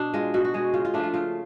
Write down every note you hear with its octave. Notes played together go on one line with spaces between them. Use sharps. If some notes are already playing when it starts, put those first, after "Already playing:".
Already playing: B2 D4
G#3 F4
B2 F#4
F#4
G#3 G#4
C#3 F4
F4
F3 A3 D4
F4
C#3 F4